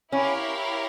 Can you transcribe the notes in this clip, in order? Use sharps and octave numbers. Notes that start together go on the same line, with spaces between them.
C#4 E4 G4 A#4 C#5 F5